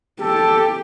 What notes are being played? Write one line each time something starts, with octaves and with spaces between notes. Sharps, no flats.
G4 A4